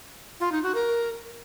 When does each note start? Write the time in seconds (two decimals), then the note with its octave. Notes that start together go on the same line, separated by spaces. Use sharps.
0.40 F4
0.52 D#4
0.63 F#4
0.75 A#4